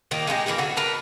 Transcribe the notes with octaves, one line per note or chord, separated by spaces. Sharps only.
A#2 D#3 A#3
G#3 D#4 E4 G4
E3 A#3 D#4 G#4
D3 F#4
A#4 B4 A5